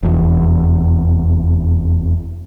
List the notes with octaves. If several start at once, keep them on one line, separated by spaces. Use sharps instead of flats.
F1 E2